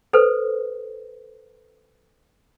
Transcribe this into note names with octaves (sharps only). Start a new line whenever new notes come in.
A4 B4 C5